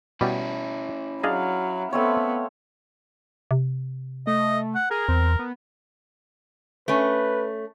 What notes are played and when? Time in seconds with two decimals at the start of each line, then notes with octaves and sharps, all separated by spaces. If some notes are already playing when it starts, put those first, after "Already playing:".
0.21 B2 G3 C#4 E4 G4
1.23 F#3 D4 G#4 D#5 F5
1.93 A3 B3 C4 C#5
3.51 C3
4.27 A3 D#5
4.75 F#5
4.91 G#4 A#4
5.08 E2 C4
5.39 B3
6.88 A3 C#4 B4